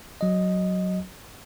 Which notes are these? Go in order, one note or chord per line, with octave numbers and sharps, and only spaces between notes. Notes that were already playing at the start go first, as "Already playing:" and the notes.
F#3 D#5